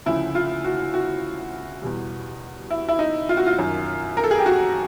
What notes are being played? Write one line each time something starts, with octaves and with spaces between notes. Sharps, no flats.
D2 C#3 F3 E4
F4
F#4
F#4
E2 B2 G3
E4
E4
D#4
F4
F#4
F4
F#2 D#3 F#3
A#4
A4
G#4
G4
F#4